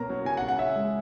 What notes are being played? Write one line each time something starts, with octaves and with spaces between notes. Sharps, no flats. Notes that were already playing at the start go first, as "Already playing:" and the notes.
Already playing: B2 A#3 C#4 A#5
F#3
C#3 G#5
F#5
C#3
F#5
C#4 E5
G#3